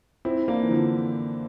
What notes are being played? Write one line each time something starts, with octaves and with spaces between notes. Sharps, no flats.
C4 E4
A#3 D4
E3
D3 F3